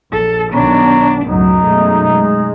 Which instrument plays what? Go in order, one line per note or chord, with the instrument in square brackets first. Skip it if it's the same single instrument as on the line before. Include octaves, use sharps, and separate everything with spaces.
[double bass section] A#1 [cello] A4
[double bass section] B1 D#3 B3 [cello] D4 [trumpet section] C#5 A#5
[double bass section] C#2 A2 F#3 [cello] F#2 [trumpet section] D#4
[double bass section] B2 G#3 A3
G#3